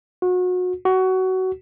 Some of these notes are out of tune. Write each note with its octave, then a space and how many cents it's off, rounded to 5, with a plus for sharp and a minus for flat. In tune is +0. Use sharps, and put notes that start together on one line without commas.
F#4 -30
F#4 +20